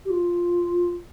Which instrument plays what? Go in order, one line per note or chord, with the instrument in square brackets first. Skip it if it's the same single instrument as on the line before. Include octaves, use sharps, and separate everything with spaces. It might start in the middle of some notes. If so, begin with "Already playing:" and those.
[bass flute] G4
F4